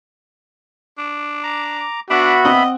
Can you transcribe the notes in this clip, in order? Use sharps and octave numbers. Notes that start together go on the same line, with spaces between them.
D4
A#5 D6
B3 D4 F#4 E5 B5
C4 D#5 F#5